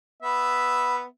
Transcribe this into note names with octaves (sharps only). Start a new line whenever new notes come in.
B3 E5